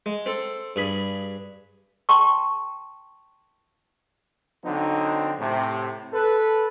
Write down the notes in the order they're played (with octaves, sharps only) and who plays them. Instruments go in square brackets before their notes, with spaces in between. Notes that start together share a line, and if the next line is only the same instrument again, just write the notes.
[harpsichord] G#3
C4 A4
G2 G#4 B5
[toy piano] G5 A5 C6 C#6
[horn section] D3 F#3 C4 D#4
A2 C3
A4 B4